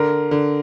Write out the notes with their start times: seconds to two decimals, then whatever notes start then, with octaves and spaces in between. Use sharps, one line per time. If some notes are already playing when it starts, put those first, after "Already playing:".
Already playing: D3 A#4
0.31 D3